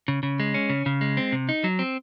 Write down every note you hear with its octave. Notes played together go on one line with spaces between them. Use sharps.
C#3
C#3
G#3
C#4
C#3
C#3
G#3
C4
C3
D#4
F#3
C4